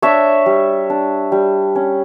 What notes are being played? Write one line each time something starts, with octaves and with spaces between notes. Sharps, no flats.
D4 C#5 E5
G3
D4
G3
C#4